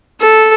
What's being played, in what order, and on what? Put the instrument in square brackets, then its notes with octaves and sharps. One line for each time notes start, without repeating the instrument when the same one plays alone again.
[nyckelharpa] A4